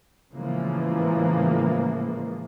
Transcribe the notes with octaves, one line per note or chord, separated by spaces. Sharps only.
A2 C#3 E3 F3 G#3 A#3